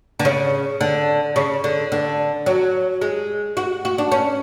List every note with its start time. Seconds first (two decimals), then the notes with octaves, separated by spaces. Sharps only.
0.19 D3
0.25 C#3
0.81 D3
1.36 C#3
1.64 D3
1.92 D3
2.46 F#3
3.01 G#3
3.57 F#4
3.85 F#4
3.98 D4
4.12 C#4